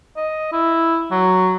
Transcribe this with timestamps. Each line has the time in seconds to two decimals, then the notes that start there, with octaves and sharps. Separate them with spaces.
0.17 D#5
0.52 E4
1.11 F#3